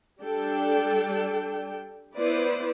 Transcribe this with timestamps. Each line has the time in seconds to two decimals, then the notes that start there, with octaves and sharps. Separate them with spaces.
0.22 G3 D4 A4 G5
2.16 B3 E4 B4 C5 D5